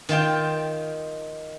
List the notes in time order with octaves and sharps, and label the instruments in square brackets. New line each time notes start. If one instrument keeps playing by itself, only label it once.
[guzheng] D#3 F4 F5 G5